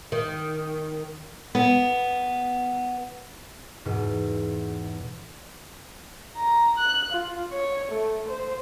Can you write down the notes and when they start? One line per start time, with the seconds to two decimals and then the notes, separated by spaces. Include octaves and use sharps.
0.12 D#3
1.55 B3
3.85 E2 G#2 B2
6.35 A#5
6.77 F#6
7.12 F4
7.53 C#5
7.91 A3
8.28 C5